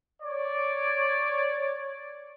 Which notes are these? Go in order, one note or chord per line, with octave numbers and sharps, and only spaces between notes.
C#5 D5